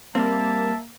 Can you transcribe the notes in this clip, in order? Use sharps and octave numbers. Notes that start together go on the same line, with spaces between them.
G3 A#3 C4 E5 A5